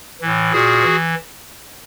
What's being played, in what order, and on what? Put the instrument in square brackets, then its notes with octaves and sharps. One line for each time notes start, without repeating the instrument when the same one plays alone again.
[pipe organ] A2 E3
A#2 F#4 G#4
E3